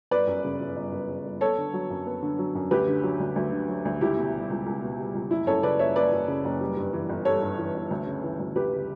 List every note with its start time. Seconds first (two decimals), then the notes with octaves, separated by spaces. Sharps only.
0.11 G1 B4 D5
0.27 F#2
0.44 C#3
0.60 G1
0.76 G1
0.92 F#2
1.09 C#3
1.25 G1
1.41 B3 A4 C#5
1.58 D3
1.73 F#3
1.90 F#2
2.06 B3
2.22 D3
2.39 F#3
2.55 F#2
2.71 D2 G4 B4
2.88 D3
3.03 F#3
3.20 D2
3.36 D2
3.52 D3
3.69 F#3
3.85 D2
4.01 C#2 E4 G4
4.17 B2
4.34 G3
4.50 C#2
4.66 C#2
4.82 B2
4.99 G3
5.15 C#2
5.31 F#1 E4
5.47 F#2 A4 C#5
5.63 C#3 B4 D5
5.79 F#1 C#5 E5
5.96 F#1 B4 D5
6.12 F#2
6.28 C#3
6.45 F#1
6.61 G3
6.77 G2
6.93 E3
7.09 G1
7.25 G3 A4 C#5
7.42 G2
7.58 E3
7.75 G1
7.91 D2
8.07 C#3
8.23 E3
8.39 D2
8.55 D2 G4 B4
8.72 C#3